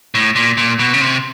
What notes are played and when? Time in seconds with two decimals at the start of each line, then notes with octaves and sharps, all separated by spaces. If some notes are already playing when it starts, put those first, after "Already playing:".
0.14 A2
0.35 A#2
0.57 A#2
0.79 B2
0.94 C#3
1.01 C3